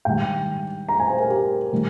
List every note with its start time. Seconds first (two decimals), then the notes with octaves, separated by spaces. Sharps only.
0.05 G#2 D#3 G3 G5
0.89 A#5
1.00 G#5
1.10 C5
1.20 A#4
1.30 G4
1.72 D#3 G3